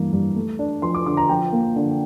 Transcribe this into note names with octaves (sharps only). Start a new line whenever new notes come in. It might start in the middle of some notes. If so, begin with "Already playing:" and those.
Already playing: G2 E3 A#3
G2
A3
D4
F3 C6
D6
D3 D6
A#5
F3 G5
A#3
D3